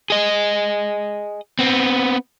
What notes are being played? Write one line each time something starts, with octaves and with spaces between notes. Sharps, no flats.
G#4 D#5
B3 C4